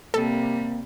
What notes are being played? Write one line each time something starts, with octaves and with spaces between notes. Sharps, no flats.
C3 G3 A#3 A4